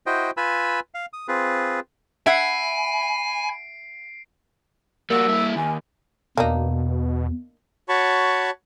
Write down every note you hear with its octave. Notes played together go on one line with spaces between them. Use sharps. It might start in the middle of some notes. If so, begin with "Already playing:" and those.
E4 F#4 C5 D#5 G5
F4 B4 G#5 B5 E6
F5
D#6
C4 F4 G#4 B4
E5 F#5 G#5 B5 C7 D7
G3 A#3 F#4 E6
G2 E4
D#2 G#5
E2 B2 A#3 D4 D#4
F#4 C#5 A5 B5 C#6